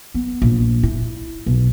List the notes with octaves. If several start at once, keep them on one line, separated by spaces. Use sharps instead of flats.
B3
A#1
E4
B1